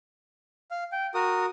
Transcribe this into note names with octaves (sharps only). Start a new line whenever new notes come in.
F5
G5
F#4 A#4 D#6